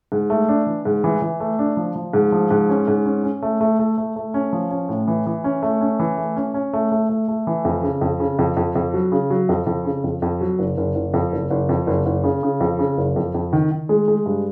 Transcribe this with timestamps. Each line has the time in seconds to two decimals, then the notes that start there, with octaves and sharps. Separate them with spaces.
0.12 G#2
0.30 A3
0.49 D4
0.67 E3
0.85 G#2
1.04 E3
1.22 E3
1.40 A3
1.59 D4
1.77 F3
1.96 F3
2.13 G#2
2.32 F3
2.51 G#2
2.69 C#4
2.88 G#2
3.05 C#4
3.24 C#4
3.42 A3
3.61 A3
3.79 A3
3.98 A3
4.16 A3
4.34 C#4
4.53 F3
4.71 C#4
4.89 A2
5.08 E3
5.27 E3
5.44 C#4
5.62 A3
5.81 C#4
6.00 E3
6.18 A3
6.36 C#4
6.54 C#4
6.73 A3
6.92 A3
7.09 A3
7.28 A3
7.47 E3
7.65 F2
7.83 C#3
8.01 F2
8.20 C#3
8.39 F2
8.57 F2
8.75 F2
8.94 F#3
9.12 C#3
9.30 F#3
9.49 F2
9.67 F2
9.85 C#3
10.04 F2
10.22 F2
10.41 F#3
10.59 F#1
10.77 F#1
10.95 F#1
11.14 F2
11.32 F#1
11.50 F#1
11.69 F2
11.87 F#1
12.06 F#1
12.24 C#3
12.43 C#3
12.60 F2
12.79 C#3
12.98 F#1
13.16 F2
13.34 F2
13.53 D#3
13.71 D#3
13.89 G#3
14.08 G#3
14.26 G2